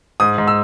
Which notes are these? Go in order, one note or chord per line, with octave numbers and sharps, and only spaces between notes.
G#2 D#6
G#2
E6